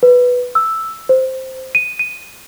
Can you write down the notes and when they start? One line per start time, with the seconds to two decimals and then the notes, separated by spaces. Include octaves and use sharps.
0.03 B4
0.55 E6
1.09 C5
1.75 D#7
1.99 D#7